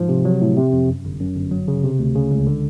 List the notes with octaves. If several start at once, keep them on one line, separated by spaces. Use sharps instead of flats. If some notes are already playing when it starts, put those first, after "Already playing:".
Already playing: G#2 F3
C3
F#3
A2
C3
F2
F#2
G1
F#2
G1
F#3
C#3
C3
D2
C#3
C#2
D3